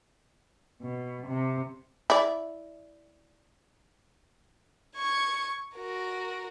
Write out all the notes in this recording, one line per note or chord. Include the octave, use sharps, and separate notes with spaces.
B2
C3
E4 D5
C#6 G#6
F#4 A#4